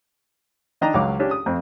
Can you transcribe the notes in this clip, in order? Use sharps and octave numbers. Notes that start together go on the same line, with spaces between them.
D#3 D4 D#5 G5 A#5
C#2 F#3 F5 D6
C#4 D4 G4
D#6
F2 C4